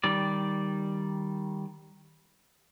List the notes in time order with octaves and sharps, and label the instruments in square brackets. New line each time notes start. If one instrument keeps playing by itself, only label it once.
[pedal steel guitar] D#3 G3 D5